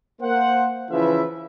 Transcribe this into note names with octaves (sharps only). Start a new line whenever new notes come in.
A#3 C5 F#5
C#3 E3 F3 E4 B4 E5